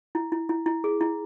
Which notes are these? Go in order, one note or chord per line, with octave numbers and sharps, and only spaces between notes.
E4
E4
E4
E4
G#4
E4